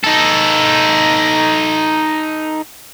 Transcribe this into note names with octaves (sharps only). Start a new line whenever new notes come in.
D#4 A4